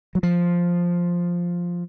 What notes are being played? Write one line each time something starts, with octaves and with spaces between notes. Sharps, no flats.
F#3
F3